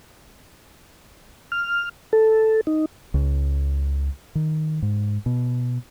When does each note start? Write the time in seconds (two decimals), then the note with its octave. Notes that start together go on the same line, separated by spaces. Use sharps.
1.52 F6
2.13 A4
2.67 D#4
3.14 C#2
4.35 D#3
4.82 G#2
5.26 B2